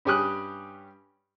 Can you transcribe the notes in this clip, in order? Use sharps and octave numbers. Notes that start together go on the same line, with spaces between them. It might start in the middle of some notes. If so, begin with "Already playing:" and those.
G2 C#4 G4 G#5 D#6 F#6